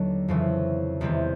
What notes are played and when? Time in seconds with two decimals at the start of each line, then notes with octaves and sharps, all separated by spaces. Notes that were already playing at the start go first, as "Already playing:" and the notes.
Already playing: D#2 D3 F#3 B3 D4
0.28 F2 C#3 E3
1.01 E2 C3 D#3 G3 C4